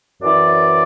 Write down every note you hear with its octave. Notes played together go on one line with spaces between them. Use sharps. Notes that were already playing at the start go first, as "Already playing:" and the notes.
F#2 E3 D5